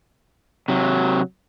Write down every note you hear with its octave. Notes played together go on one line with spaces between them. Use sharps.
C3 F#3